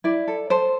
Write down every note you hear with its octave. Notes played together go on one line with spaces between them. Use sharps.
E4 D5
A4
A4 C5